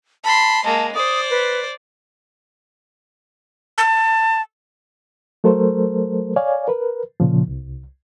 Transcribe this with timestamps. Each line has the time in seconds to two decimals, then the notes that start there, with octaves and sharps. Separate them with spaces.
0.24 A5 B5 C6
0.65 G#3 A#3 A5
0.95 C5 D5 D#6
1.30 B4
3.78 A5
5.44 F#3 A3 A4 A#4 C5
6.36 C#5 D5 F5 G#5
6.68 A#4 B4
7.20 A#2 C#3 F3
7.48 C2